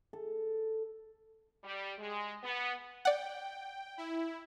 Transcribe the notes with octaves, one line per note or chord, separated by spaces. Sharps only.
A4
G3
G#3
B3
D5 F#5 G5
E4